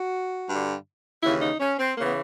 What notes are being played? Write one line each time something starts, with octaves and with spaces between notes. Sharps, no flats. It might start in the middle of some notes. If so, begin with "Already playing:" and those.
Already playing: F#4
G2 D3
D#2 C#3 E3 E4
D#4
C#4
C4
C#3 E3 A#3
B3